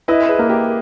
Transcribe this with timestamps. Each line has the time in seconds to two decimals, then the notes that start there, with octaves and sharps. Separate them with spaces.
0.08 E4 B4 D#5
0.29 G#4 B4
0.39 A#3
0.49 G4 A#4